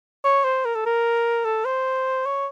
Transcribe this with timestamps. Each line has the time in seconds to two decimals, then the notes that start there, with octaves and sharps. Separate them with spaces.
0.24 C#5
0.45 C5
0.65 A#4
0.76 A4
0.86 A#4
1.45 A4
1.66 C5
2.26 C#5